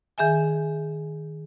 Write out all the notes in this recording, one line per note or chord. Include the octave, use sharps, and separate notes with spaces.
D#3 G#4 E5 G#5